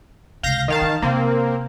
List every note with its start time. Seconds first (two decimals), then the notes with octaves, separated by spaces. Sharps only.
0.43 C#2 C3 F5 G6 A#6
0.68 D#3 F5 A5
0.82 E3
1.02 C3 A#3 C4